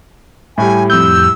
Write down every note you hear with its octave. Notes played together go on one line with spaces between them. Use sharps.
A2 G3 G#5
F2 E6 G6